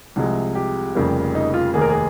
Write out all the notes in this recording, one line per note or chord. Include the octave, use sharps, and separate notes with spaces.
C2 C3 F3 G#3
G4
F1 F2 C#3 G3 A#3
D#4
F4
F1 D#2 D#3 A#3 G#4
A#4
G#4